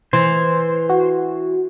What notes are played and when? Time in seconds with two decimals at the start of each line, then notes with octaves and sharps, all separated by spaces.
0.13 E3 C5
0.90 F#4